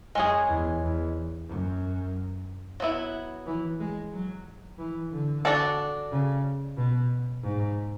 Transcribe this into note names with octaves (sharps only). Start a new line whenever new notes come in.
F#2 G#3 C#4 G#4
E2
E2
F#2
F#3 B3 E4
E3
G#3
F#3
E3
D3
D4 F#4 A4 D5
C#3
B2
G#2